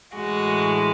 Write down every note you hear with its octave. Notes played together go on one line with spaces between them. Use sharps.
A2 E3 G#3 F#4